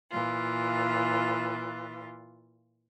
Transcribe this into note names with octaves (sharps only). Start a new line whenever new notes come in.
A#2 E3 F4